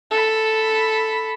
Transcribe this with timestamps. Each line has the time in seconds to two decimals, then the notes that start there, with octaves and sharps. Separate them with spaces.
0.11 A4 B5